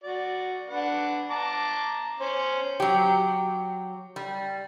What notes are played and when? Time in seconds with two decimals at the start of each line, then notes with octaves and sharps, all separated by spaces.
0.03 F#4 D5
0.68 D4 B4 F#5
1.30 A5 A#5 D6
2.20 C#4 C5
2.80 F#3 G4
4.16 G3